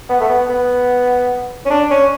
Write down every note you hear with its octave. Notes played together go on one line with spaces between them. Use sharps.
B3
A3
B3
B3
C#4
D4
C#4